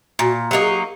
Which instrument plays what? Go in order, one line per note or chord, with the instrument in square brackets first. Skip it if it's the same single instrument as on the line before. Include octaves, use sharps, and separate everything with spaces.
[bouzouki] A#2 [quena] F#4
[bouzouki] F#3 A#3 D#4 [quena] G4
[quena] G#4
G4